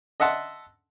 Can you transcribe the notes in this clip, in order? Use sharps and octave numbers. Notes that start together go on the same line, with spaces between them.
D#5 E5 F#5 A5 C6